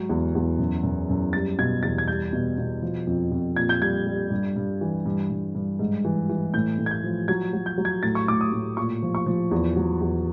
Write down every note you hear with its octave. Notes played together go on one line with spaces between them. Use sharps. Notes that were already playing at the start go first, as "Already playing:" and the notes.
Already playing: G#2 F#3
E2
E2
F#2
F#2
F#2
G3 A6
B2 G#6
E2 A6
G#6
G3 G6
B2
B2
F3
F2
F2
A#2 G#6
G6
G3 G#6
G3
G2
G2
E3
G2
G2
G2
G#2
E3
E3
A2 G6
A2
G#6
G6
F3
F#3 G#6
F#3
G6
F#3
G#6
A2 A6
C#6
A2 D6
D#6
A2
A#2 C#6
F3
C#6
F3
E2
F#3
E2